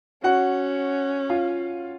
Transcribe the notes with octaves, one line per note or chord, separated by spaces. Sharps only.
C#4 F#4 F#5
F4 F5